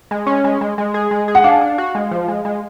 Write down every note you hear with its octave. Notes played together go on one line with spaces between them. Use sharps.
G#3
C#4
G#3
G#3
G#3
G#4
G#3
G#4
F#5
D4 F5
D4
F#4
G#3
F3
G#3
G#3